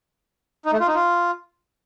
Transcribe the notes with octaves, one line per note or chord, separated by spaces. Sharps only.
D#4
A3
F4
D#4
F4